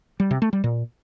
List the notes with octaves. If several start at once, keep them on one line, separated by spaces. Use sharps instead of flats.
G3
C3
A3
G3
A#2